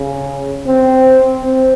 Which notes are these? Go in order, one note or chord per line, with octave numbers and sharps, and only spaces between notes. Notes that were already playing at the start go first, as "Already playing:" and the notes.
Already playing: C#3
C4
C4